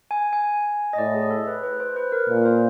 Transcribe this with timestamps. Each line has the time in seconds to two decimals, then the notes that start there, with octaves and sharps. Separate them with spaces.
0.11 G#5
0.33 G#5
0.93 D#5
0.98 A2 D5
1.14 G#4
1.31 A4
1.47 B4
1.63 B4
1.80 C5
1.96 B4
2.12 A#4
2.29 A#2
2.46 C5